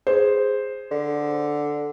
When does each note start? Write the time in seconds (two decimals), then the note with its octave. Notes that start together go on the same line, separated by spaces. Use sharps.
0.07 G#4 C5
0.91 D3